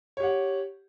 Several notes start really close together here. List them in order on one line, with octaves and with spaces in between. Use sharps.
C#5 G4 F#5